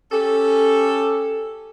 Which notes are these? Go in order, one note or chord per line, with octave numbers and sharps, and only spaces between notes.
C#4 G4 A4